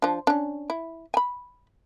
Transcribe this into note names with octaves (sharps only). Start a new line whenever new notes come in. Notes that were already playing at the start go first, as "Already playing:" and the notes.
F3 D4
C#4 D4
E4
G#5 B5